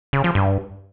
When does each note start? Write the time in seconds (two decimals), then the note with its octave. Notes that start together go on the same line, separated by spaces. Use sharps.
0.13 C#3
0.24 F3
0.35 G2